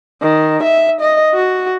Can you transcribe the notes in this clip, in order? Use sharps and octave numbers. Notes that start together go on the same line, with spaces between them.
D#3
E5
D#5
F#4